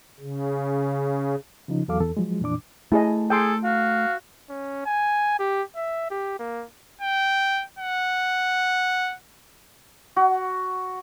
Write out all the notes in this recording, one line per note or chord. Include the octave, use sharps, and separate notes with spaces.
C#3
C#3 F3 D#4
E2 F#3 A4 F5 D6
E2 A4
F3 F#3 G#3
F2 A#2 E3 D4 D6
A3 E4 G#4 D#5
G#4 A4 G5 C6
F#4 F5
C#4
G#5
G4
E5
G4
A#3
G5
F#5
F#4